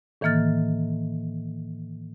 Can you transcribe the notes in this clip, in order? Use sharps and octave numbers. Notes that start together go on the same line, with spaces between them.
A2 D#3 E3 A#3 F6 A6